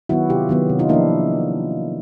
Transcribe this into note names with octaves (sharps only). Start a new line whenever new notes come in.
D#3 F#3 B3 E4 F#4
C3 F4 G4
D#3 F#3 B3
C3
D#4 F4
F3 A#3 D4 E4